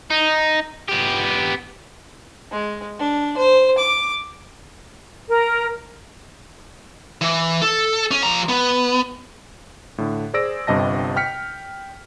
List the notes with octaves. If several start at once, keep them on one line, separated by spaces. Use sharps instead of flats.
D#4
B3 G4
G#3
D4
C5
D6
A#4
E3
A4
C#4
F3 A#5
B3
A2 D3
G#4 C5 D5 E6 A#6 D7
G1 G2 C3 D#5 A5 A#6
G5 F6 B6 C#7